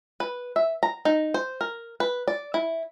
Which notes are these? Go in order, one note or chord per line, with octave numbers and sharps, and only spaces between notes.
B4
E5
A#5
D#4
C5
A#4
B4
D5
E4